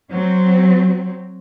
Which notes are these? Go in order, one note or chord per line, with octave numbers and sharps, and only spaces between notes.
F#3 C4